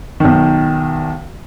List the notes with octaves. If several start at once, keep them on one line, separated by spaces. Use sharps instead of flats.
B1 D#3